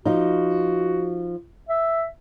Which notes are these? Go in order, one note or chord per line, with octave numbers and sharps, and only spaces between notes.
F3 D#4 F#4
E5